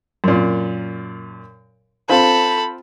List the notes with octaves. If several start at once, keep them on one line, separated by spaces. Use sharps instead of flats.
F#2 A#2
C4 F4 A4 B5